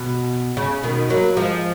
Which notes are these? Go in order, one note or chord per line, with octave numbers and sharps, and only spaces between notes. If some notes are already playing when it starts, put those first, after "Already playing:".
Already playing: B2
C#3
B2 D#3
F#3 A#3
F3 G#3